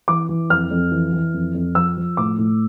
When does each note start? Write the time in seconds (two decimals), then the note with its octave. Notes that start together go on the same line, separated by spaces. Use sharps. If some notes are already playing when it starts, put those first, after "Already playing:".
0.08 E3 D6
0.29 E3
0.50 F2 F6
0.71 F2
0.91 E3
1.13 E3
1.34 F2
1.54 F2
1.75 F3 E6
1.97 F3
2.17 A2 D6
2.38 A2